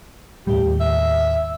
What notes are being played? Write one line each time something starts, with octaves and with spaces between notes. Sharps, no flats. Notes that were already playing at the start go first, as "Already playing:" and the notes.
D#2 A2 G3 G4
E5